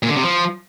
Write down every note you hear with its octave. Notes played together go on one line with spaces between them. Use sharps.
A#2
D3
C3
F3